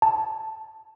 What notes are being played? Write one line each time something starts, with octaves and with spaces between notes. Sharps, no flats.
A5